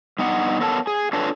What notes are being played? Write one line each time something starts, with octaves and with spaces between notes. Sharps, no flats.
G2 B3 D#4 F#5
B3 A4 A#4 C#5 A5
G#4
D4 F4 A4 B4 C#5